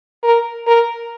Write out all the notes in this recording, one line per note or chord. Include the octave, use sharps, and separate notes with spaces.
A#4
A#4